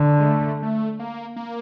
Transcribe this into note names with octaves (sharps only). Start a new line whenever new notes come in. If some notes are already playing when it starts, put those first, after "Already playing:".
Already playing: D3
G#3
A3
A3
A#3
A#3